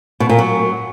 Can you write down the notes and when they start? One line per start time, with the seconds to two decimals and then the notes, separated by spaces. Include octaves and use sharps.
0.20 B2
0.29 A#2
0.38 F#3